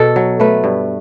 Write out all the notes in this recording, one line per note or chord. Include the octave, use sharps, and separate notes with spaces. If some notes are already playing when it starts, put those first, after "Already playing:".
Already playing: B2 A4
F#3
A3 B4
G2